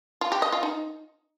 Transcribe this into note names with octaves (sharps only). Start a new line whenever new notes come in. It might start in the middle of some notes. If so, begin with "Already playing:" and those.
F4
G4
D#5
F4
D#4